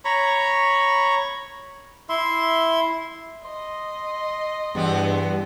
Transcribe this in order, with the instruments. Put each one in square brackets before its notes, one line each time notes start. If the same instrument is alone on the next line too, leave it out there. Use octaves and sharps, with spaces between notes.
[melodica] C#5 A#5 B5 C#6
E4 E5 C6
[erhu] D#5 [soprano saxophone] C6
[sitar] E2 B3 C4 [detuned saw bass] G2